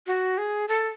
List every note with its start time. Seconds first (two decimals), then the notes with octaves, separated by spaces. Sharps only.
0.07 F#4
0.38 G#4
0.68 A4